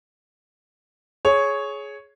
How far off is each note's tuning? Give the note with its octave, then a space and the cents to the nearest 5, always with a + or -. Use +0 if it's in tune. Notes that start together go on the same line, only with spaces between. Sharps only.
G#4 +15 C#5 +0